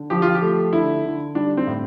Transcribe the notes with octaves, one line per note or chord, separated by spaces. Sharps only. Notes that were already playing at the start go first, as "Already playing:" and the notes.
Already playing: D3
F3 G4
F4
G4
A3
D3 E4
D3
G3 D4
C4
A2